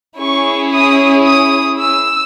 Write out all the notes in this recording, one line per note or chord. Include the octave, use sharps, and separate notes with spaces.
C#4 E4 G#4 C#6
D#6
D#6
E6